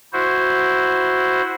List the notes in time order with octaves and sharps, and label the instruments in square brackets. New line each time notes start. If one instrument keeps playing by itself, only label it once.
[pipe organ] E4 F#4 C5